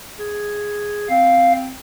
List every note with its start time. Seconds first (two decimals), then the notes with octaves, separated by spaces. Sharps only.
0.19 G#4
1.10 C4 F5